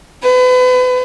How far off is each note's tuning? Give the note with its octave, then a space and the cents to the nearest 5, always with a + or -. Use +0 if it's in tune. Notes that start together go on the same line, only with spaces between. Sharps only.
B4 +35